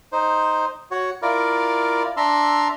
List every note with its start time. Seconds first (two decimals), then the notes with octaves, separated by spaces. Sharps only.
0.12 D#4 C5
0.91 F#4 C#5
1.22 E4 F4 A#4 D5
2.17 D4 E5 A#5 C6 E6